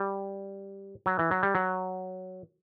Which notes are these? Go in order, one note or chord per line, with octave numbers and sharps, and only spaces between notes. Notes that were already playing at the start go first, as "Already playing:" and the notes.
Already playing: G3
F#3
E3
F#3
G3
F#3